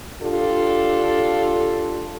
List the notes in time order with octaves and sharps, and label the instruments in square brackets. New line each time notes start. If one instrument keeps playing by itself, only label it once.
[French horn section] D4 F4 G4 A4